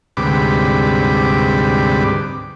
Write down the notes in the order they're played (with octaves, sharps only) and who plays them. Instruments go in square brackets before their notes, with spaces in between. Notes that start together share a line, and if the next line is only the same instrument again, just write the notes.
[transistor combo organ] D2 G#2 C3 G3 B4 D6